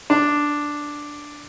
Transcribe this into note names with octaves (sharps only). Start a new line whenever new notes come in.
D4